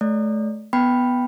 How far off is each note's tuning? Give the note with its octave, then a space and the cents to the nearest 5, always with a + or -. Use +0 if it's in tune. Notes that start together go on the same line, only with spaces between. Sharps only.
A3 -30 D5 -40
B3 +0 G5 -5 B5 +0